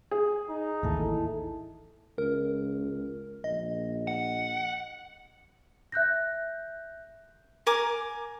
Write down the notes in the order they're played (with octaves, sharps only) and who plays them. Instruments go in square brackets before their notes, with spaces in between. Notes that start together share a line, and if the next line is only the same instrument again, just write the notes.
[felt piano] G#4
[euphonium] D#4
[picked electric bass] A1 D#2 [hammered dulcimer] E3 A4
[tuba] C#2 [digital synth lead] A#4
[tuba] A#1 [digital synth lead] D#5
[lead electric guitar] F#5
[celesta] E5 F#6 G6 A#6
[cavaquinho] A#4 G#5 D6